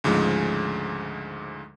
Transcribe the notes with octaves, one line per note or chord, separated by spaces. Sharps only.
D2 G#2 C#3 F3 G#3